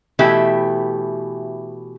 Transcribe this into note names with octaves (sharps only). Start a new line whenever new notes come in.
B2 E3 A3 E4 G4 E5